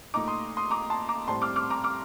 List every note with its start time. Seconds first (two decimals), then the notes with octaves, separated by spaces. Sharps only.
0.14 A#2 A3 D#4 A#5 D6
0.28 C6 D#6
0.57 C6 D#6
0.71 A#5 D6
0.90 A5 C6
1.09 A#5 D6
1.28 A2 G3 C4 A5 C6
1.42 D6 F6
1.56 D6 F6
1.70 A#5 D6
1.84 D6 F6